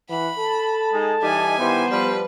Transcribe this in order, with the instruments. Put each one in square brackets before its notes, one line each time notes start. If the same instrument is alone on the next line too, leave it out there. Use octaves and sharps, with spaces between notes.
[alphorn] E3 [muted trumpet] F#5 [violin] B5
[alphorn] A4 [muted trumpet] A5
[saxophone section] G#3 D#4 G#4
[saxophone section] E3 G3 D#4 [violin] G#5
[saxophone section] D#3 G3 E4 [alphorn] B3 [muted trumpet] C5
[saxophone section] F3 G3 [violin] B4